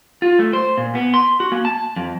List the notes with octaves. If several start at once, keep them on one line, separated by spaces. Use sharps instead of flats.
F4
A3
C5
A#2
B3
C6
F#4
A#3
A5
F2